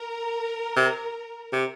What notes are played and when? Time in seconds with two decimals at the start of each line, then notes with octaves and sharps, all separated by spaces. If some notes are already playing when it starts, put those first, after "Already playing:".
Already playing: A#4
0.76 C3
1.53 C3